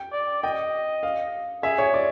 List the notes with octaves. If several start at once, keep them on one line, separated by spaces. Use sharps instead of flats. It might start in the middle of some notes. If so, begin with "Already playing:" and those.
Already playing: G5
D5
D#5 G5
F5
G#4 E5
C#5
D5